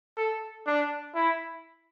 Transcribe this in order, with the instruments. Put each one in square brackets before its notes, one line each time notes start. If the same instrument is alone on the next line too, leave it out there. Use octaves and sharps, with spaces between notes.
[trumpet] A4
D4
E4